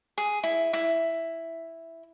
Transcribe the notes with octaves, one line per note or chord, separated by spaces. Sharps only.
G#4
E4
E4